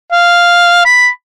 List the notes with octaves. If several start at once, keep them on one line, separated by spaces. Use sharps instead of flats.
F5
B5